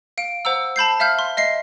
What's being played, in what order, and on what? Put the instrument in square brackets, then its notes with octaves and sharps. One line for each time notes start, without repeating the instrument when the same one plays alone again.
[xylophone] F5 D7
C5 F#5 A#5 E6
A5 B5 G6 C7
E5 F5 F6 G6
C6
D#5 E5 C7